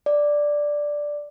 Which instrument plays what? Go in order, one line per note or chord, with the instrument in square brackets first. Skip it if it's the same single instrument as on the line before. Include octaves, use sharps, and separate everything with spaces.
[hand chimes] D5